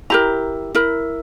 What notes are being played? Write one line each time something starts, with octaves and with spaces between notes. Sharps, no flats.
E4 G4 A#4 A#5
E4 A#4